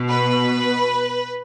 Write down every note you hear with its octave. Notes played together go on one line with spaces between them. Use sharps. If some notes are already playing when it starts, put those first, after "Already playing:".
Already playing: B2
B4